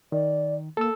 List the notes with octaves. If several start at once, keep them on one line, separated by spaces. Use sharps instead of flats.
D#3 D5
A#3 A4 E6